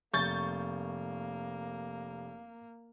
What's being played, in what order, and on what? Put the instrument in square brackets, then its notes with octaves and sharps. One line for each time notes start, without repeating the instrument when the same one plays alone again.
[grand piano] F1 [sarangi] A#3 [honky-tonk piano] C#6 G6 A6